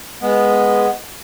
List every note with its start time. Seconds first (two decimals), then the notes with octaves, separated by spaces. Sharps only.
0.22 G#3 B3